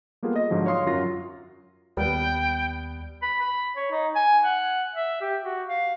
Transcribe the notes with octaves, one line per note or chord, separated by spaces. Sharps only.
G3 A#3 B3 F4 G#4 A4
D#5 A#6
G#2 D3 F3 F#3
C#5 F5 C6 D#6 C7
F#2 F#3 F4 A#6
D#2 G3 B3 G5
B5
B5
C#5
D#4
G#5
F#5
E5
G4
F#4
F5